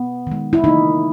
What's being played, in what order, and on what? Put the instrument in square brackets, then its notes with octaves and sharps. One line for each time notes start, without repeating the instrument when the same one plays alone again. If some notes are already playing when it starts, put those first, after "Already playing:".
Already playing: [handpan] B3
D#3 G#3
E4
C#3 E3 A#3 D#4